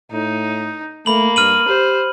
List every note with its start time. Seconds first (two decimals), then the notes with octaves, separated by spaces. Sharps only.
0.12 A2 D#4
1.06 A3 A#3 B5 F#7
1.36 G2 F6 D#7 F#7
1.68 G4 C5